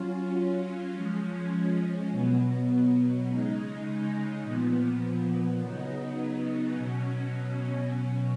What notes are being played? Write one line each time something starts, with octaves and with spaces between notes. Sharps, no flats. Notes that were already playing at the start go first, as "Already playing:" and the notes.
Already playing: F#3 C#4 F4
F3 G#3 C#4
B2 F#3 B3
C#3 G#3 D#4
A#2 F3 B3
C#3 F#3 B3 D#4
B2 F#3 C#4
B2 F#3 C#4